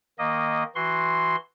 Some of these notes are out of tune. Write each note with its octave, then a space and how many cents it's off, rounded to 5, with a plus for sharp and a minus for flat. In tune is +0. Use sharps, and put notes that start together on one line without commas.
D#3 +0 A#3 +0 D#5 -10
E3 -5 F#4 +0 C6 +0